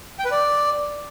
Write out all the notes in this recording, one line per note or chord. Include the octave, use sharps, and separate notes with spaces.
G5
B4
D5